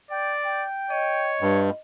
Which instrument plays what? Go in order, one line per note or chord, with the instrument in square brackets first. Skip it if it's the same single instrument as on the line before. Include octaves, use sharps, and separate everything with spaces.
[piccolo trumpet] D5 [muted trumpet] G5
[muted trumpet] G5
[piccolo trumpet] C#5 [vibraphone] D#5
[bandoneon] G2 [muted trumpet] F4